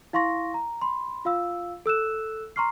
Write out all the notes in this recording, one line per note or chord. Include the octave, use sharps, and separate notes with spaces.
E4 F5 C6 C#6 A#6
A#5
B5 C6
F4 F5 E6
A4 E6 F#6 E7
A#5 C6 C#6 F6 C7